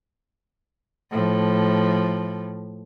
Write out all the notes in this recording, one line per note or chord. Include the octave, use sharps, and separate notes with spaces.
A2 F3